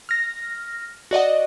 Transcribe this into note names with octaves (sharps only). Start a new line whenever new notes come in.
F6 A#6
F#4 D5 D#5 F#5